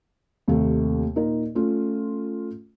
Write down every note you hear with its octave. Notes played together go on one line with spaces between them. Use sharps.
D#2 C3 A3
A#2 D#4 A#4
A3 C#4 F4